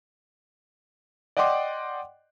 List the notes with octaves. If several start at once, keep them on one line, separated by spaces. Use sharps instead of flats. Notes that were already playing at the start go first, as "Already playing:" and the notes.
D5 D#5 F#5 G5 C6 D6